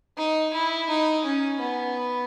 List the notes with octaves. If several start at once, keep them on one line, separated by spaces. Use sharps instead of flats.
D#4
E4
D#4
C#4
B3